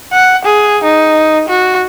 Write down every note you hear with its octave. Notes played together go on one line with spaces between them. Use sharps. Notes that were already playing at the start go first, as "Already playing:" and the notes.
F#5
G#4
D#4
F#4